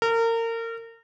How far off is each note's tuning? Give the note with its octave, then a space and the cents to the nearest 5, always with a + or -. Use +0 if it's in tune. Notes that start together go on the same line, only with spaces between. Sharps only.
A#4 -30